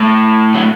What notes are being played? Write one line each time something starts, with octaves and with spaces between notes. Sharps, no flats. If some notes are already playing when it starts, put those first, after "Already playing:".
Already playing: A2
F#3